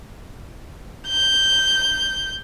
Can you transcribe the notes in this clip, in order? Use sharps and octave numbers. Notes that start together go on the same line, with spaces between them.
G6